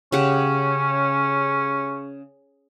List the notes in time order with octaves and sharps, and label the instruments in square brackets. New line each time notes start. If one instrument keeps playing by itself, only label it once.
[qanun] C#3 G4 F#5 [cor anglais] C#4